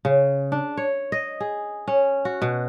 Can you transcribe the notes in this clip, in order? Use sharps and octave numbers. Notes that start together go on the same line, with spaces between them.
C#3
D4
C#5
D#5
G#4
C#4
F#4
B2